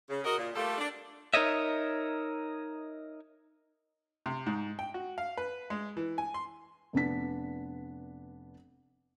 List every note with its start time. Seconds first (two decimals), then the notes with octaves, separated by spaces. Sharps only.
0.09 C#3
0.24 F#4 A#4 D#5
0.38 A#2
0.55 G3 A3 A#3 F4 G4 A4
0.78 D4
1.34 D#4 A#4 C#5 D#5 E5
4.26 C3
4.46 G#2
4.79 G5
4.94 F#4
5.18 F5
5.37 B4
5.70 G#3
5.97 E3
6.18 G#5
6.34 C6
6.93 F1 B3 D4 B6